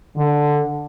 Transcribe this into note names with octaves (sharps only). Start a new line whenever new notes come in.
D3